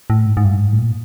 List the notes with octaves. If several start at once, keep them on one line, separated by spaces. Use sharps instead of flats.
A2
G#2
G#2
G2
G#2
A2
A#2